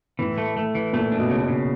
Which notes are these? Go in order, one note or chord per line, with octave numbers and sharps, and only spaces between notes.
A2 E3
A3
A3
E3
A#2 A3
D4
B2
C#3
B2
C#3